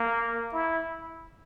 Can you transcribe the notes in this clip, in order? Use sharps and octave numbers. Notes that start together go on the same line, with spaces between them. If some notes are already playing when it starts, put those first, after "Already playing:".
Already playing: A#3
E4